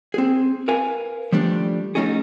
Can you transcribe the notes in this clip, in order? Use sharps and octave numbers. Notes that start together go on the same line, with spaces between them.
C4 G#4
A#4 B4 F5 G#5
F3 G3 A3 D4
A3 C#4 D#4 F#4 G#4